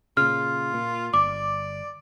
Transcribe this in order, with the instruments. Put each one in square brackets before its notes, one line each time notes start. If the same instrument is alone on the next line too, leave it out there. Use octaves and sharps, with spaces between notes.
[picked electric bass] A#2 C#3 [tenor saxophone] F4 [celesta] F6
[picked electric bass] A#2
[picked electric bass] G1 [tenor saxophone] D5 [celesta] D6